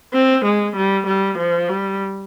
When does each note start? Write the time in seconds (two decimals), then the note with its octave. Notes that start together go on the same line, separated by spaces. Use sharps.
0.13 C4
0.45 G#3
0.76 G3
1.07 G3
1.39 F3
1.69 G3